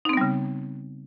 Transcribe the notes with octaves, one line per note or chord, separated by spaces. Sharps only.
C#3 G3 B3 C4 D#4